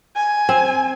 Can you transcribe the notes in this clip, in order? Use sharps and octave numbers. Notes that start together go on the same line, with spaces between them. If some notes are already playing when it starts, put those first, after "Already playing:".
G#5
C4